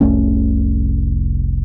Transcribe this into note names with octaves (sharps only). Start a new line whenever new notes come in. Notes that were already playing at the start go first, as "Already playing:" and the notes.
F1 C2 A3 C#4